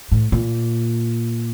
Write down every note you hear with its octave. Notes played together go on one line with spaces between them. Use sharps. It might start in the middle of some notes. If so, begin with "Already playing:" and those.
A2
A#2